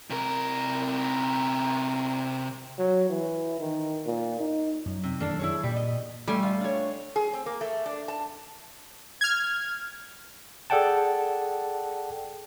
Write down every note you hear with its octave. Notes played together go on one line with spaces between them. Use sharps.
C3 A#4
F#3
E3
D#3
A#2
D#4
F#2
C3
F#2 D#3 E3 A#3 D4 A4
E4 G#4 C#5
A#2 G3
D#5
G3 A3 G#5 C6
F4
D4 C#5
G#4
C4
A#3
A3
D4
A5
F6 G#6
G#4 A4 D5 F#5 G5 A5